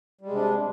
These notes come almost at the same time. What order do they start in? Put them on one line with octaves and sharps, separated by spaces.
G3 G#3 C3 D4